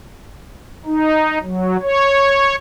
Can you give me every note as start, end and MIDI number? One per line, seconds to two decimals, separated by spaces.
0.86 1.38 63
1.42 1.77 54
1.82 2.55 73